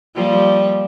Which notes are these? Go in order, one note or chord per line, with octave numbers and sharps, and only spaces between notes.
F3 G3 A#3